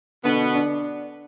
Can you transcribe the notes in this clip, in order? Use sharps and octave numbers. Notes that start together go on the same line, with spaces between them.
B2 D3 B3
D4